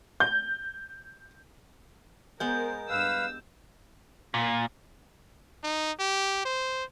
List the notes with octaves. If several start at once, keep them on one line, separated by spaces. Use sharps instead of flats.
G6
G#3 B3 A#4 C5 G6
G2 B4 F5 E6
A#2
D#4
G4
C5